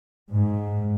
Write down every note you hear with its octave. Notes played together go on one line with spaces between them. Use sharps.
G#2